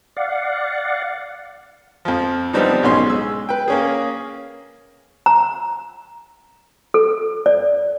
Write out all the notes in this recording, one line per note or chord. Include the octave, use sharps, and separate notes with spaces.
D5 F5 F#5
F2 F3
F3 G3 B3 C4 D4 D#4
B1 G#2 B2 C#4 C6
G#3 E6
B4 G5
A#3 C#4 G#4
A#5
A4
D5